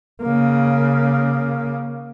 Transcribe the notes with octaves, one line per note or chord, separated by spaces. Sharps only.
C#3 A#3